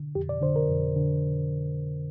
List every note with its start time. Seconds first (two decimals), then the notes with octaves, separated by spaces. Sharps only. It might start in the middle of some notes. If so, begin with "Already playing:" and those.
Already playing: D3
0.15 F2 G4
0.29 D5
0.42 D3 C5
0.56 A#4
0.69 F2
0.96 D3